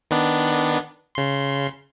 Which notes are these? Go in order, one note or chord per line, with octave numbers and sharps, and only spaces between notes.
D#3 B3 D4
C#3 C6